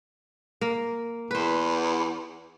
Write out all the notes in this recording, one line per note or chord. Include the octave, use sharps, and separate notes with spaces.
A#3
E2 B4 C5